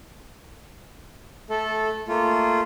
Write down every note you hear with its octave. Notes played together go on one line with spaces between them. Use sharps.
A3 A4
A3 A#3 F4